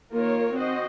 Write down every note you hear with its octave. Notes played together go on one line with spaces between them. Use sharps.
D#3 A#3 F4 A#4 C#5
C4 F#4 C5 D#5